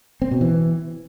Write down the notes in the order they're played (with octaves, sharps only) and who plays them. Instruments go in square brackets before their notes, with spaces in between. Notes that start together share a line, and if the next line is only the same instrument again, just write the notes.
[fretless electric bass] C4
B2
E3